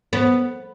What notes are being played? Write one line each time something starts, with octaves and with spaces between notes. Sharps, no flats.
B3